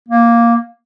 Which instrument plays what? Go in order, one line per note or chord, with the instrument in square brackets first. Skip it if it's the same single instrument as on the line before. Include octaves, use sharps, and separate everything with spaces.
[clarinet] A#3